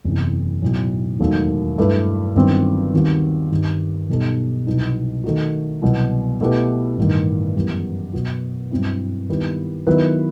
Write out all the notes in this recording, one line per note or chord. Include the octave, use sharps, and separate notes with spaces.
F#1 E2 C3
B1 A2 F#3
E1 D#2 D#3 F#3 A3
G2 F#3 A3 E4 B4
G1 G2 D#3 F#3 C4
D#2 D#3 G3 C4 F#4
G2 D#3 G3
B1 B2 G3 D#4 A4
C2 B2 F#3 B3 D#4
D#3 A3 D#4 F#4
C2 B2 F#3 B3
B2 A3 E4 G4 B4
A1 G2 D#3
F#2 E3 G3 B3
B2 F#3 B3 F#4
G2 F#3 C4 E4
D#3 G3 B3 E4 B4
D#3 F#3 B3 E4 B4